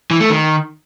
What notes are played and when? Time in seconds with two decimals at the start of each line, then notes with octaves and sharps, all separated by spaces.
0.11 E3
0.20 A3
0.30 D#3